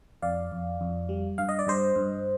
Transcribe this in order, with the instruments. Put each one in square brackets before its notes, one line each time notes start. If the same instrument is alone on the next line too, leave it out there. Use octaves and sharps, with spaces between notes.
[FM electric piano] F2 D5 F5
F2
F2
G3
G2 F5
D#5
D5
G2 C5 D#5
G2